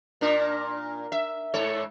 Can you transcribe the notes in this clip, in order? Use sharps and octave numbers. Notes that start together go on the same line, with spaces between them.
A#2 D4 A#4
E5
G#2 A4 C#5